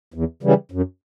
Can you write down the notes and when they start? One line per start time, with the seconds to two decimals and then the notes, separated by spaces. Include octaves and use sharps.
0.14 E2
0.43 C#3 E3 G3
0.72 F#2